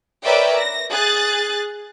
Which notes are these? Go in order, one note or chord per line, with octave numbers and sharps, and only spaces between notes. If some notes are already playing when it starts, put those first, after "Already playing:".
A#4 B4 C#5 D5 E5 G5
A#6
G#4 F#6 A6